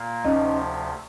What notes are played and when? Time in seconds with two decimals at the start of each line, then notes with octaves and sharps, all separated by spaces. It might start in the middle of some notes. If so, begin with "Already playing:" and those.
Already playing: A#2 A#3
0.24 D2 C3 F3 C#4 D#4